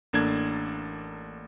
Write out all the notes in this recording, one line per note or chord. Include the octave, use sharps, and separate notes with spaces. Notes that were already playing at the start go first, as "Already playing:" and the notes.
A1 A#3 D4 A4 G#6